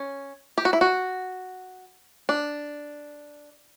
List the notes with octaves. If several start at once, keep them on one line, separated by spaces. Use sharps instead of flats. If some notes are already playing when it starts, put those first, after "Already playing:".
Already playing: C#4
G4
F#4
E4
F#4
D4